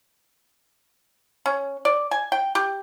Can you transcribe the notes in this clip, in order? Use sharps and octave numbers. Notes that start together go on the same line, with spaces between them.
C#4
D5
G#5
G5
G4